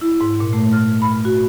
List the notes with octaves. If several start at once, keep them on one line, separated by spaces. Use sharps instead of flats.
E4
G#2
A#2
A3
F6
B5
F#4